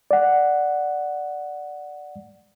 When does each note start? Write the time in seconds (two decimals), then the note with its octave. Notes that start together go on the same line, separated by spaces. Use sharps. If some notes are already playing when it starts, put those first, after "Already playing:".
0.11 D5 F#5